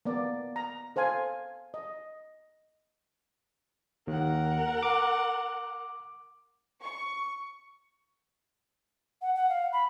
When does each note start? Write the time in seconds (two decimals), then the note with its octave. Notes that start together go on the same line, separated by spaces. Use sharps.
0.05 A#3 B3 D5
0.56 A#5
0.96 A4 C5 F5 G#5 A5
1.74 D#5
4.07 D#2 A#4 F#5
4.83 D6
6.82 C#6
9.21 F#5
9.35 F#5
9.49 F5
9.72 B5